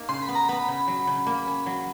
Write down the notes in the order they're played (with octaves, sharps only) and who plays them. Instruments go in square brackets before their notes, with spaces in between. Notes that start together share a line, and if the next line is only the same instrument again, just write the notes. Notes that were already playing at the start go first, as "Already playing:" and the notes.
Already playing: [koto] A#3 D#4
[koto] C#3 [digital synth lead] C6
[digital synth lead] B5
[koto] B3
[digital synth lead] A#5
[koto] B3 [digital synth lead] B5
[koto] C#3
F#3
C#3
A#3
C#4
F#3